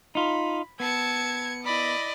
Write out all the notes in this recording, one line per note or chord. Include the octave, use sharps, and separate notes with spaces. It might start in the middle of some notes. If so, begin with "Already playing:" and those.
D#4 F4 B5
B3 A5 E6 G#6 C#7
E4 D5 D#5 B5